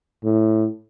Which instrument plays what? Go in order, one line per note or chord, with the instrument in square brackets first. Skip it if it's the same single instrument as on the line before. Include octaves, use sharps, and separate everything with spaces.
[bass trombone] A2